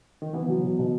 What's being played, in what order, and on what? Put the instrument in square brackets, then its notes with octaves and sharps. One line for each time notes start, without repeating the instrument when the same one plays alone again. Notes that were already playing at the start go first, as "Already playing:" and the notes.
[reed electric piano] D#3
[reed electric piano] E3 [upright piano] B3
[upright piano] F#3
B2
B2